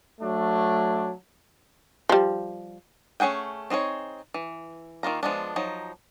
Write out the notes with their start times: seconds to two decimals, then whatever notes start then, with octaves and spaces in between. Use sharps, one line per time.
0.20 F#3 A3 D4
2.09 F3 G3
3.20 A3 C#4 G#4 F#5 G5
3.70 C4 D#4 G#4 C#5
4.34 E3
5.03 D#3 A#3 F4 A#5
5.23 F3 G#3 B3 D4
5.56 F3 F#3 D#4